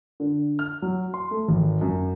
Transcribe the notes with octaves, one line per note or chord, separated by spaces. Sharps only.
D3
F6
F#3
C6
A3
G#1
F#2